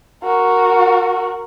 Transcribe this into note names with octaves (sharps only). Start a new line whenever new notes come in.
F#4 A#4